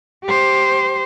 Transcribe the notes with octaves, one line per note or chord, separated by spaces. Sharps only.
G4 C5